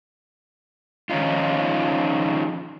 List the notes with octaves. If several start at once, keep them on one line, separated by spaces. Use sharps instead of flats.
D#3 F3 C#4 D#4 F4